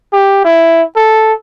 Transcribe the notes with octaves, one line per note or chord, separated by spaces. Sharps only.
G4
E4
A4